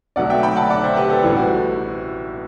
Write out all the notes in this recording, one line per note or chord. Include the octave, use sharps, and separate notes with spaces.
B1 B2 F#3 A3 D5 F#5
E5 G5
G5 B5
F#5 A5
D5 F#5
C5 E5
G4 B4
A4 C5
A1 A2 G3 E4
F#4